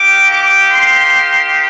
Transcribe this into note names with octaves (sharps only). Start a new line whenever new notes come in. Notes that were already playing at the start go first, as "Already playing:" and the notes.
Already playing: A#3 D#4 G4 D6
D6
C6